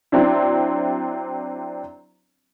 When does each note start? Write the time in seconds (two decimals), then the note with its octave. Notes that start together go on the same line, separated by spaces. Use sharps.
0.12 F#3 C4 D4 E4